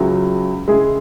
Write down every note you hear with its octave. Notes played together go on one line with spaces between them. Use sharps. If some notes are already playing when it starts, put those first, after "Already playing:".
Already playing: C#2 C#3 F#3 E4 G#4
C#3 G#3 E4 G#4